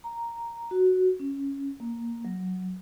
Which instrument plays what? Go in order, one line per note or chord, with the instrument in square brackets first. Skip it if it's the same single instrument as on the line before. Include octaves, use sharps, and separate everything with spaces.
[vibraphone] A#5
F#4
C#4
A#3
F#3